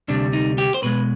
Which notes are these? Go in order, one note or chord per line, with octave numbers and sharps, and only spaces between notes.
D2 C3 G3 D4
D#4
G4
C5
B1 B2 G#3 B4